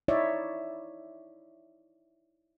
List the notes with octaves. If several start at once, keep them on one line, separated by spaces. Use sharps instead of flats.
D#4 E4 C#5 D5 E5